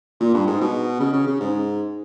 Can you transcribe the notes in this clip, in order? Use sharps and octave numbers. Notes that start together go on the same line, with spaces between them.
A#2
G2
G#2
B2
C#3
C#3
C#3
G#2